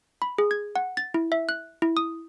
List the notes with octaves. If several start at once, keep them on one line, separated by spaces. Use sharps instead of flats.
B5
G#4
G#6
F#5
A6
E4
E5
F#6
E4
D#6